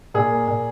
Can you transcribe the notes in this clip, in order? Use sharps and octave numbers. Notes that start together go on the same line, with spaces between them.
A#2 G#4
A#3
A#2